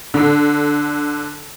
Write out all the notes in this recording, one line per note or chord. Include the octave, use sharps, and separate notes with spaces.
D3